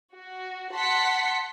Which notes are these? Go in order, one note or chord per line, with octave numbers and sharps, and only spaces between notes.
F#4
F#5 A5 C6 B6 C#7